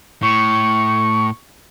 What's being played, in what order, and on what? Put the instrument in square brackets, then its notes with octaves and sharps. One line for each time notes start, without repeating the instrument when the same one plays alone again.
[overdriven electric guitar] A2 [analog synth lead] C#6